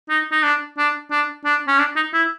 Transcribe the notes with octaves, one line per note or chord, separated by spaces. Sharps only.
D#4
D#4
D4
D4
D4
D4
C#4
D4
D#4
E4